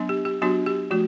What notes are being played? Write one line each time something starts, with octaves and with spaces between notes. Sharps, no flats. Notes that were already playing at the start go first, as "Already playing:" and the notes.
Already playing: F#3 B3 D4
G4
G4
F#3 B3 D4 F#4
G4
F3 A3 F#4